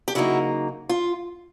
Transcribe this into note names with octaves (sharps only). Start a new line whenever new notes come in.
G4
C#3 F#3 A#3 D#4 E4 F#4
F4